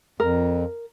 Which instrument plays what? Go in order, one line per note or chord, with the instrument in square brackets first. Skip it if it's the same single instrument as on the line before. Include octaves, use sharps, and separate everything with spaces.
[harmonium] F2 [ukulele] A#4